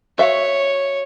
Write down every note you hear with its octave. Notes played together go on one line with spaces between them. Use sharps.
F#4 C#5 E5 F5